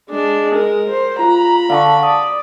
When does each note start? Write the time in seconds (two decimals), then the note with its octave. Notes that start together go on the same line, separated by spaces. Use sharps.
0.10 G#3 D4
0.55 A#4
0.89 C5
1.19 F4 A#5 B5
1.70 D3 F5 A5 C#6
2.03 D5 D#6